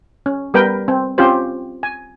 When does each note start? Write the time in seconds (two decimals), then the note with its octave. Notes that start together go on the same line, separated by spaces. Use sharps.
0.26 C#4
0.54 G3 B3 A#4 B4 G5
0.88 C4
1.18 C4 C#4 F4 G4 C5
1.83 G#5